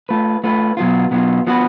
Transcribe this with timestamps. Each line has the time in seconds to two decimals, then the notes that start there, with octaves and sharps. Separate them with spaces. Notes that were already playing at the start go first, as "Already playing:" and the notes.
0.09 A3 F4 B4
0.44 A3 F4 B4
0.77 B2 F#3 B3 F4
1.11 B2 F#3 B3 F4
1.47 F3 B3 F#4 B4